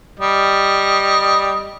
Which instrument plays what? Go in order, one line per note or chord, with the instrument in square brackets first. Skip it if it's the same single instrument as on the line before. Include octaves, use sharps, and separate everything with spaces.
[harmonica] G3 D#5